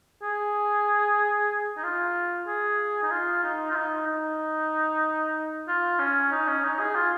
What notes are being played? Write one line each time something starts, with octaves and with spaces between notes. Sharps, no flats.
G#4
D#4
F4
G#4
D#4
F4
D#4
F4
D#4
D#4
F4
C#4
D#4
C#4
D#4
G#4
F4